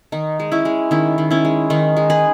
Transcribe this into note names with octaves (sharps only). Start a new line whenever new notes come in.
D#3 D#4
G#3
C#4 E4
G#3
D#3 C#4 E4
D#3
C#4 E4
G#3
D#3 D#4
G#3
G#4 B4